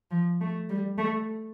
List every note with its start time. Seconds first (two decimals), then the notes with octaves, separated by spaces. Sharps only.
0.11 F3
0.41 A3
0.70 G3
0.98 A3